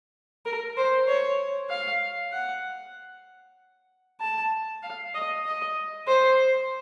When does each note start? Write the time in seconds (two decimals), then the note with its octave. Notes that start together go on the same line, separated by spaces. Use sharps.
0.45 A#4
0.77 C5
1.08 C#5
1.70 F5
2.32 F#5
4.21 A5
4.83 F5
5.14 D#5
5.45 D#5
6.08 C5